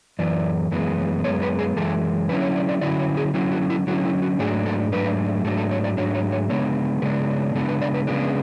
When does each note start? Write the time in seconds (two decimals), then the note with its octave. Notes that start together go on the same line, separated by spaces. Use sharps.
0.19 F#2 E3 D5
0.71 F#2 E3 G#3 B3
1.24 F#2 E3 G#3 B3 C#5
1.42 B4
1.59 G#4
1.76 F#2 E3 G#3 A4
2.29 D3 F#3 C#4 E4 B4
2.42 C#5
2.56 D5
2.69 D5
2.81 D3 F#3 C#4 E4 D5
2.99 C#5
3.17 G#4
3.34 D3 F#3 C#4 E4 F#4
3.52 F#4
3.70 E4
3.87 D3 F#3 C#4 E4 F#4
4.05 E4
4.22 F#4
4.39 G#2 F#3 A3 D4 G#4
4.66 A4
4.92 G#2 F#3 A3 D4 B4
5.44 G#2 F#3 A3 D4 A4
5.58 A4
5.71 C#5
5.84 D5
5.97 G#2 F#3 A3 D4 C#5
6.15 C#5
6.32 C#5
6.49 C#3 G#3 B3 D4 C#5
7.02 C#3 G#3 B3 D4 B4
7.55 C#3 G#3 B3 D4 A4
7.68 B4
7.81 D5
7.94 B4
8.07 C#3 G#3 B3 D4 G#4